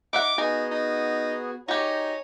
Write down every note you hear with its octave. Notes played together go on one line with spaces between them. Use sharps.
D#4 E5 F#5 D6
B3 D#4 F#4 G#4 G#5
D#4
D#4 F#4 G4 C#5 G#5 A#5